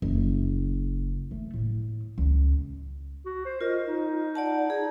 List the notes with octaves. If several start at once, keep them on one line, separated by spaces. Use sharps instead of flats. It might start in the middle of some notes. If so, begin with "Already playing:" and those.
F#1
A3
A2
C#2
F#4
C5
F4 A#4 D#5
D#4
D5 F#5 A5
D#4 G#4